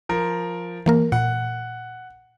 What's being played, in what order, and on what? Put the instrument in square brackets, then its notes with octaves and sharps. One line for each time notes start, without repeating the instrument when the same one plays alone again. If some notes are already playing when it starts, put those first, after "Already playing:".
[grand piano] F3 A#4
[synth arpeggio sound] E3 A#3 A#4
[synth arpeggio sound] A#2 [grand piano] F#5